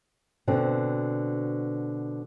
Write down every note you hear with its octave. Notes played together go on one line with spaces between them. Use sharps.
B2 D3 C4